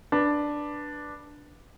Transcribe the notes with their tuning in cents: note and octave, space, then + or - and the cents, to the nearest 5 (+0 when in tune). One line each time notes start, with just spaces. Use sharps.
D4 +0 B4 -10